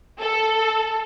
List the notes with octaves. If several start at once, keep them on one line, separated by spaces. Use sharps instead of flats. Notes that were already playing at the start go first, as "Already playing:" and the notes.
A4